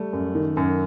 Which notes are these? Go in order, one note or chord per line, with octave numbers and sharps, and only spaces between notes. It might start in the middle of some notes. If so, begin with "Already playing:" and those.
Already playing: G3 A3
F#2
D#3
F#2